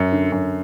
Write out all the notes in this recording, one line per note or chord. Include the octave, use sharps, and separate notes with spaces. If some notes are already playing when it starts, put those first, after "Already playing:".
Already playing: F#2
D3
F#2